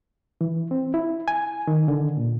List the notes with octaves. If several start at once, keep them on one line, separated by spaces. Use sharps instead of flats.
E3
C4
E4
G#5
D#3
D3
A#2